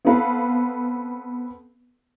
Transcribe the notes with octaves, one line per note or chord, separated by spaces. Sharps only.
B3 C4 A4 B4 F5